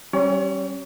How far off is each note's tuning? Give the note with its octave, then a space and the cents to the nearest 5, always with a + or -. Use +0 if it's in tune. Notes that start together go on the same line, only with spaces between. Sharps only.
G3 -25 C#4 -30 C#5 +40